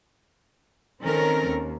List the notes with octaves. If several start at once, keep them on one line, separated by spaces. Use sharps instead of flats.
D#3 C4 C#4 A4 A#4
D#2